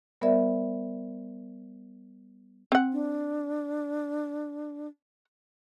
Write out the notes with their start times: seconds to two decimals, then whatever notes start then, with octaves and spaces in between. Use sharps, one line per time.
0.21 G3 B3 A#4 C5 D5 E5
2.72 C4 F#5
2.93 D4